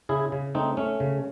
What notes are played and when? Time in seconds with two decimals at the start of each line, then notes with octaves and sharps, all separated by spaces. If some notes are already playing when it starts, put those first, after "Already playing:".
0.09 C#3 E4 G#4
0.32 C#3
0.55 A3 C4 D#4
0.77 A3 C#4
1.00 C#3